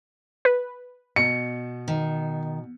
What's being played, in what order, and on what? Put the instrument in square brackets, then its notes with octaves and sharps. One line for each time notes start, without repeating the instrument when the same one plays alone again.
[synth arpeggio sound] B4
[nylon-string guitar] B2 [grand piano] C#7
[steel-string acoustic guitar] D#3